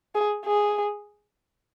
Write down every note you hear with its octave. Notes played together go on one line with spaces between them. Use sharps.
G#4
G#4